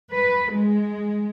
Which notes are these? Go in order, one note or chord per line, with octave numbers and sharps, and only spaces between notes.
B4
G#3